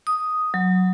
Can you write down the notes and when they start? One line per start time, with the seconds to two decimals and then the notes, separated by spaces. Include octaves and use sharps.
0.07 D#6
0.54 F#3